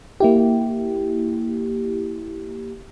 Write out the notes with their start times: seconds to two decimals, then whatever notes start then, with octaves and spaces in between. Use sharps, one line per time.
0.20 A#3 E4 G4